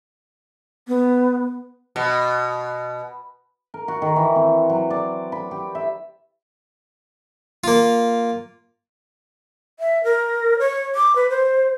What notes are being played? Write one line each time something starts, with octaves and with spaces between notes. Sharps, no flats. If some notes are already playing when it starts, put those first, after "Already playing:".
B3
B2
A#4
F#4
D#3
E3
C4
F#3
D5
B5
G4
E5
A#3 F4
E5
A#4
C#5
D6
B4
C5